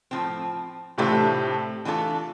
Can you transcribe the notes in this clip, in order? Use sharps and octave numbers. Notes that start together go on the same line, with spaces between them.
A2 F3 C4
A2 C3 E3 A3 D4 F4 A4
E3 A3 D4 F4 A4